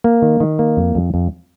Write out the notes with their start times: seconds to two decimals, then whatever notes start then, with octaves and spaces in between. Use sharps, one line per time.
0.04 A#3
0.22 D#3
0.40 D#3
0.59 A#3
0.77 F2
0.95 F2
1.14 F2